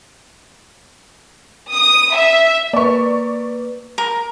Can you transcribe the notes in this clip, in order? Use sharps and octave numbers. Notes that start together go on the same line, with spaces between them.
D#6
E5
A#3 B4 D5 C#6
A#4